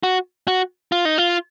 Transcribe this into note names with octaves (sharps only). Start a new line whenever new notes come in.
F#4
F#4
F4
D#4
F4